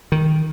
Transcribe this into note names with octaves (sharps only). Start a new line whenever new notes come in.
D#3